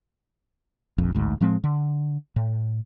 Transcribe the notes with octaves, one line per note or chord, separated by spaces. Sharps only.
F1 A#1 F2
A1 D2 G#2
A2 F3 G#3 C4
D3
A2